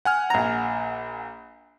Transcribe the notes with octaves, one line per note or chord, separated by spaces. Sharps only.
F#5 G#5 F6
A#1 A#5